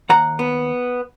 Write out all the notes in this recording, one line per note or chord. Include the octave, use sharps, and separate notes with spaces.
D#2 F#5 A#5
B3